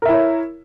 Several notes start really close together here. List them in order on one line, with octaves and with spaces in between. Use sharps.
A#4 E5 E4 C#5